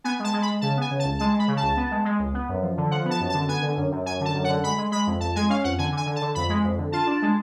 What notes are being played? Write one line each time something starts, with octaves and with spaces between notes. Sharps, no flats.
B3 G#5
G#3 A5
G#3
B5
G#3
C#3 A5
B3 G#5
C#3
A5
C#2
G#3 A5
G#3
B5
C#3
A5
C#2
B3
G#3
G#3
C#2
B3
F#2
F3
D3
F3 F#5
B3
A5
F#2
A5
D3
B3 G#5
D3
F#2
F#2
F#2 G#5
D3 A5
F#2
F#5
D3
G#3 B5
G#3
G#3 B5
F2
F2 A5
G#3 G#5
C#4 F5
F2 F#5
D3 G#5
D3
G#5
D3
A5
D3
F2 B5
G#3
F2
D3
F4 A5
D4
G#3